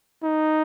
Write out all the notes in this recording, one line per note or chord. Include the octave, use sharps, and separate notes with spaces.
D#4